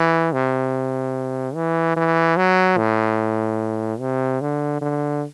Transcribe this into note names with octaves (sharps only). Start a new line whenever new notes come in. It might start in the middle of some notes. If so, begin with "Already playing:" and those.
Already playing: E3
C3
E3
E3
F#3
A2
C3
D3
D3